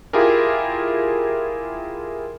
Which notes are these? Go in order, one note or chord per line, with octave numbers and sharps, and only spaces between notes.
E4 F4 G4 G#4 A#4